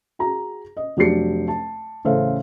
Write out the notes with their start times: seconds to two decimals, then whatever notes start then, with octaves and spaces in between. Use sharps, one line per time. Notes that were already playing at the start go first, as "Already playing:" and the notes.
0.19 F#4 G#4 A#5
0.77 D#5
0.97 F1 F#3 D4 G4 C7 C#7
1.48 A5
2.05 A1 C#3 A4 C5 E5 F5